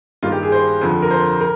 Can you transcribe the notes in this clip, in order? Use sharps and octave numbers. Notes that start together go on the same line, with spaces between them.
G2 D#3 G3 A#3 F4
G4
G#4
C5
F2 D3 F3
A#4
C5
A#4